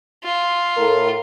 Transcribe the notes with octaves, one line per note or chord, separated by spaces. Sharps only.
F4
A2 A#4